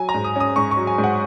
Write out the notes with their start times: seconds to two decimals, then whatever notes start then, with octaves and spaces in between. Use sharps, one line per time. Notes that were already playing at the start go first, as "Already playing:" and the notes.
Already playing: F#3 G#5
0.09 A#5
0.14 G#2
0.24 D#6
0.36 C#4 D#6
0.56 G#2 C#6
0.71 C#6
0.77 F#3
0.87 G#5
0.98 G#2
1.04 F#5